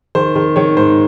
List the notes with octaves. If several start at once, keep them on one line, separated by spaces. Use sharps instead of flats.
D#3 C5
D#3
D#3 C#5
G#2 C5